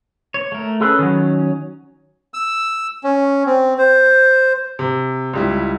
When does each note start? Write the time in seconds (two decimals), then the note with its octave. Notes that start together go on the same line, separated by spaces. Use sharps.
0.34 C#5
0.52 A3 A#4
0.81 C#4 G#4 A4 B4
0.99 D#3 F#3
2.34 E6
3.04 C#4
3.46 C4
3.78 C5
4.79 C3
5.34 C#2 G3 E4